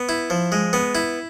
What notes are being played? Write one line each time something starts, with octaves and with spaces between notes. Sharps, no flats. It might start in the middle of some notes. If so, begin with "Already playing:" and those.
Already playing: B3
E4
F3
G#3
B3
E4